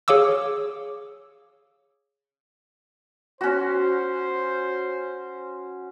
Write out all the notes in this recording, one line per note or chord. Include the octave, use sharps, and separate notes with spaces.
G#4 C#5 F5 D6 E6
C#4 F#4 C5